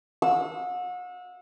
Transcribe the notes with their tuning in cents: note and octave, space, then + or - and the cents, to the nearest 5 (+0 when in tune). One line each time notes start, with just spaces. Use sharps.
F#5 -40 E6 -5